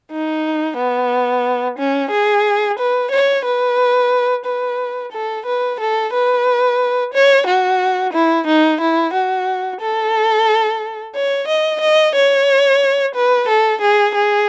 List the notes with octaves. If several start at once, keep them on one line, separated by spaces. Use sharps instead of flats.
D#4
B3
C#4
G#4
B4
C#5
B4
B4
A4
B4
A4
B4
C#5
F#4
E4
D#4
E4
F#4
A4
C#5
D#5
D#5
C#5
B4
A4
G#4
G#4